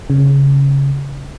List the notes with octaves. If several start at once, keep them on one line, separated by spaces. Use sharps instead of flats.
C#3